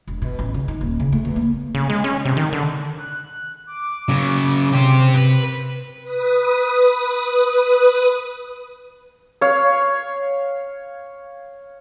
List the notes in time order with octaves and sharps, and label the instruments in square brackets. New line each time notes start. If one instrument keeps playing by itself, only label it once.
[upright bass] E1
B2
A1
C#3
D#4
D#1
C#3
A3
E2
A#3
[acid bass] C#3
G#3
C#4
C3
D#3
D3
[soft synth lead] F#6
D6
[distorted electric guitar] C#3 F#3
[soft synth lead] C3 [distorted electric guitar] G4 C5
[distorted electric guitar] B4
[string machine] B4 D#6
[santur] C#5 F5